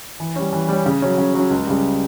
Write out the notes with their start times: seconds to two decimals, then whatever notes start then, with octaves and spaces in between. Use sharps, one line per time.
0.20 E3
0.36 G3 C#4
0.53 E3
0.69 G3 C#4
0.86 C#3
1.02 F#3 C#4
1.18 C#3
1.34 F#3 C#4
1.50 C#2
1.67 C#3 G3